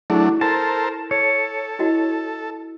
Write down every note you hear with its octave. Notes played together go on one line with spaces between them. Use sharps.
F#3 A3 D4 E4 G#4
A4 A#4 C5 A5
A4 C#5
E4 F#4 D#5